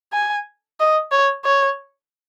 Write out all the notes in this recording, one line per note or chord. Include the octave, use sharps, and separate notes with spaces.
G#5
D#5
C#5
C#5